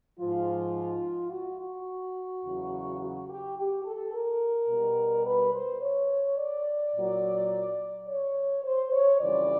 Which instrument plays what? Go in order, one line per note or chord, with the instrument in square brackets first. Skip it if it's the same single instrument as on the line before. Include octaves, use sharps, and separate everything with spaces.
[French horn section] G#2 F3 F4
F#4
F#4
E2 C#3 F#3
F#4
G4
G4
A4
A#4
B2 G3
B4
C5
C#5
D5
A#2 F#3
C#5
C5
C#5
F2 C#3 E3 G3 D5